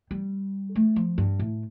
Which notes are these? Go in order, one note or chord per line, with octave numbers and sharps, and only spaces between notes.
G3
A3
F3
G2
A2